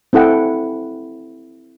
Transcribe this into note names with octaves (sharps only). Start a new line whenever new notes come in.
C4 E4 A4 F#5 G5